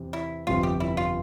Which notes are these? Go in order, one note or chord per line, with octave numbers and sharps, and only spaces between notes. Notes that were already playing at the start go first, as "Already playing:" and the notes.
Already playing: E2 C3 C4
E4
G1 F2 C3 F3 C4 F4
G4
E4
F4